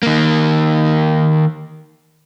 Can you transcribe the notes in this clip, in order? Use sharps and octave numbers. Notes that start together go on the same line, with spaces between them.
D#3 A#3